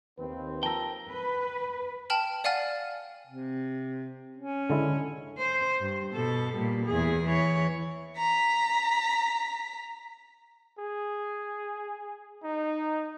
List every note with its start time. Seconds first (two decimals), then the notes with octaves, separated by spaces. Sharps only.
0.18 D#2 C4 B4
0.63 F3 A#4 G5 A5 A#5 E6
1.10 B4
2.10 G5 A5 F6 F#7
2.44 D5 F5 F#5 G#5 F6 A6
3.27 C3
4.37 C#4
4.70 D3 G#3 E4
5.38 C5
5.81 G2
6.13 B2 A4
6.55 A#2 G3
6.86 E2 G#4
7.25 E3 C#5
8.17 A#5 B6
10.78 G#4
12.44 D#4